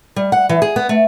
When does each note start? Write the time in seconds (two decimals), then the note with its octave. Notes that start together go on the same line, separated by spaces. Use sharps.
0.16 G3
0.32 F#5
0.49 E3
0.62 G#4
0.76 B3
0.89 A3